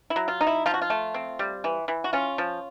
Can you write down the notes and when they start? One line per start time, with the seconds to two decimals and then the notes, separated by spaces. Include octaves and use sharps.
0.10 E4
0.16 F#3
0.28 F4
0.41 D#4
0.47 E4
0.66 F3 F4
0.74 F#4
0.82 F4
0.90 A3
1.14 C4
1.39 G3
1.64 E3
1.88 E3
2.04 F#4
2.13 C#4 F4
2.38 F3